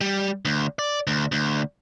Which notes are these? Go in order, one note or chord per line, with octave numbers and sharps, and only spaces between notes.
G3
D2
D5
D2
D2